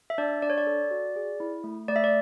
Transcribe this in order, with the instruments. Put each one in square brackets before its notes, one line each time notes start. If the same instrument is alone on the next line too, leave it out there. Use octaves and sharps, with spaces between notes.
[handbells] E5
D4 D5
D4 D5
C#5
D5
A4
F#4
G#4
E4
A3
A3 D5
E5
D5